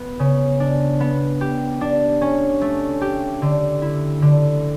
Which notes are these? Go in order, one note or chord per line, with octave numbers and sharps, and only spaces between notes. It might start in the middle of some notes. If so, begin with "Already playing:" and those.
Already playing: B3
C#3
D4
B3
G4
D4
C#4
A3
G4
D3
E4
D3